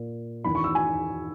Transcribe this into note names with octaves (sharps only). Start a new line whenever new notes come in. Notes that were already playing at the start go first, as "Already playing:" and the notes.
Already playing: A#2
E2 D#3 B5
C#6
E6
G#5